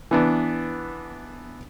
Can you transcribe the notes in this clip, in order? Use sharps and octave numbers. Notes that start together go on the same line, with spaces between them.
E3 B3 D4